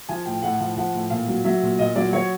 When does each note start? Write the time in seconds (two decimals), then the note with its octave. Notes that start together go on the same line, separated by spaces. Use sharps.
0.09 F3 G#5
0.26 A2 G5
0.42 A2 F#5
0.60 F3
0.77 F3 F#5
0.94 A2
1.10 A#2 F5
1.28 F#3
1.44 F#3 E5
1.62 A#2
1.79 A#2 D#5
1.96 F#3 D5
2.13 F#3 C#5